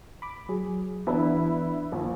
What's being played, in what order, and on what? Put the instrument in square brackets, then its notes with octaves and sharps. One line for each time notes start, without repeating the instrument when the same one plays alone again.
[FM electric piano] B5 D6
[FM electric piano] F#3 [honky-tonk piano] G#4
[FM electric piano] E3 D4 [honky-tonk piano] B3 E4 B4
[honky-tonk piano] A#1 A#3